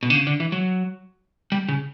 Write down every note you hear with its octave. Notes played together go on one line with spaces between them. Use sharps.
B2
D3
C#3
D3
E3
F#3
G3
C#3